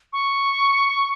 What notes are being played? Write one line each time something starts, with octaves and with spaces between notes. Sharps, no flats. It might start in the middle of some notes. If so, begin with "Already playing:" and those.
C#6